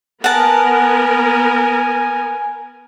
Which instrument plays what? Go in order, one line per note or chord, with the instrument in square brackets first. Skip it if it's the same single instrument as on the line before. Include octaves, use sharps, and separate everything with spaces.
[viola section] B3 A#4 [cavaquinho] F#5 A5 [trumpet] G#5